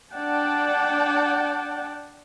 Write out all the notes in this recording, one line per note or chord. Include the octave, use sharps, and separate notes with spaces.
D4 D5 F#5 G5 A5